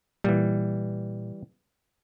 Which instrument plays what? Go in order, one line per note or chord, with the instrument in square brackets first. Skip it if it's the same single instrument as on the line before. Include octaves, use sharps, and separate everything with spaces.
[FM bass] A#2 [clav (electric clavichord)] E3 G3